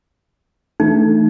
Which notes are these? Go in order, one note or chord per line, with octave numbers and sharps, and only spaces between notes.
E3 A3 D#4